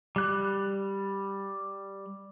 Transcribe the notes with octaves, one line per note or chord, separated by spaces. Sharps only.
G3 F#6